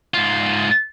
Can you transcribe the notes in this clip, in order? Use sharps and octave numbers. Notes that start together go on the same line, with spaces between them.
G#2 F4